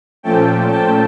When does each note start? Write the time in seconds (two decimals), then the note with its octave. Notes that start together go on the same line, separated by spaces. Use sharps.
0.23 A#2 F3 A3 C#4 G5 A5
0.71 G5 A5